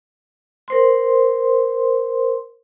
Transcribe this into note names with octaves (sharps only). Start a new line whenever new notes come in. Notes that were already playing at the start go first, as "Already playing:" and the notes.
A#4 C5 C6